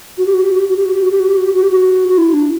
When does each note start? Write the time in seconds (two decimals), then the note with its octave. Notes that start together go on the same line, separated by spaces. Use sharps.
0.18 F#4
0.26 G4
0.34 F#4
0.43 G4
0.52 F#4
0.59 G4
0.68 F#4
0.77 G4
0.85 F#4
0.94 G4
1.03 F#4
1.11 G4
1.20 F#4
1.28 G4
1.37 F#4
1.46 G4
1.54 F#4
1.63 G4
1.71 F#4
2.09 F#4
2.18 E4
2.33 D4